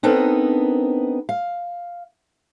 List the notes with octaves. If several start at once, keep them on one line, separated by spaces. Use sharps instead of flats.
B3 C4 D4 D#4 A4 A#4
F5